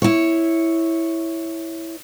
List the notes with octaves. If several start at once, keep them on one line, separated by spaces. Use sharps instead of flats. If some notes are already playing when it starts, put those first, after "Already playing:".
E4 C#5